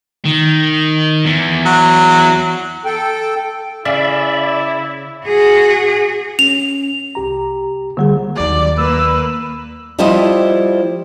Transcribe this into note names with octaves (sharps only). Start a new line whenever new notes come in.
D#3
E2
F#3
A4 G5
C#3 E4 D5 E5
F#4 G#4
C#4 F7
C2 G4 A#5
D3 G3 A#3 G#4
D#2 F#3 D5
A#3 B4 E6
F3 G3 E4 G4 C5 D#5